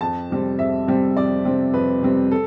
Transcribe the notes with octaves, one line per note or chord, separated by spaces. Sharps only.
F2 A5
C3 G3 C4
F2 E5
C3 G3 C4
F2 D5
C3 G3 C4
F2 B4
C3 G3 C4
A4